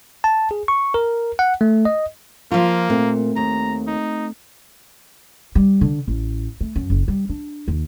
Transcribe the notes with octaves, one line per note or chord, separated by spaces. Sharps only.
A5
G#4
C#6
A#4
F#5
A3
D#5
F3 A#3 F4
A#2 A3 C4
D#2 A#5
D#4
G3
D3
A1
A3
F#2
F#1
G3
D4
D#2